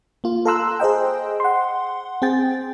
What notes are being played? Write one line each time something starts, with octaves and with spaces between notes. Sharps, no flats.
A#3 F4
A4 F5 A#5 C6 E6 F#6
G#4 C5 D#5 G5
F#5 C6
C4 G#4 G5 A6